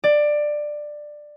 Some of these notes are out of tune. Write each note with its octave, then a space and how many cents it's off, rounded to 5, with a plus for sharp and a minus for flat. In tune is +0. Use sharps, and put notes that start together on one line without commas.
D5 +15